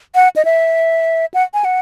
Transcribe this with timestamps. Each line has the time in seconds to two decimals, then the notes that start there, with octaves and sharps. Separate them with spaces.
0.15 F#5
0.36 D#5
0.45 E5
1.34 F#5
1.54 G#5
1.65 F#5